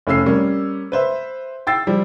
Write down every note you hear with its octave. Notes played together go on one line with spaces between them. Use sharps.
F1 A3 C#4 E6 C7
G3 A#3 C#4
B4 C5 E5
G5 E6 A6 C7
F3 G3